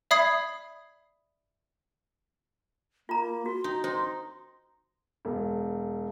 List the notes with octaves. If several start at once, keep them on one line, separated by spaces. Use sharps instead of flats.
D5 E5 B5 D#6 G#6 C7
A#3 F4 A#5
F#4 C6
D#4
D#4 C5
E1